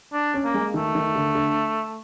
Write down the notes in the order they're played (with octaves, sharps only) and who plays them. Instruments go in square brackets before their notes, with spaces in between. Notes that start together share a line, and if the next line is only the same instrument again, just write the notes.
[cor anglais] D4
[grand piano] C#4
[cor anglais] A#3
[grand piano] G#3
[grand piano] D#3 [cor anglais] A3
[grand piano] D#3
D3
D3